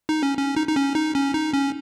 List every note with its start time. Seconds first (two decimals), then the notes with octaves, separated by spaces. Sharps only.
0.09 D#4
0.23 C#4
0.38 C#4
0.56 D#4
0.67 D#4
0.76 C#4
0.95 D#4
1.15 C#4
1.34 D#4
1.53 C#4